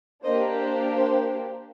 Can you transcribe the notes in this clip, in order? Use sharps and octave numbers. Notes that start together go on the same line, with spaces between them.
A#3 D4 G4 C5 D#5
C5
C5